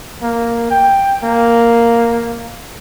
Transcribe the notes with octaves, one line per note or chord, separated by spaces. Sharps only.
A#3
G5
A#3